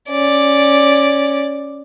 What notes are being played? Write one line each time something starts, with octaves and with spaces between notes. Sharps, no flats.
C#4 D5